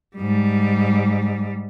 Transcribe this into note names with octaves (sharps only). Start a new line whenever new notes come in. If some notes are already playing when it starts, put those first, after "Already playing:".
G#2 G3